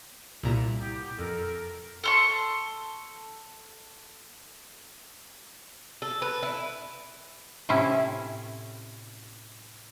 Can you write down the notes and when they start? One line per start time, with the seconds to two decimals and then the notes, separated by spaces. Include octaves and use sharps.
0.43 C2 A#2 A#5
0.80 B3 E4 G4
1.19 F2 A4 A#4
2.03 A4 C6 C#6
6.02 A4
6.22 B4
6.43 E4
7.69 A2 C3 C#4 E4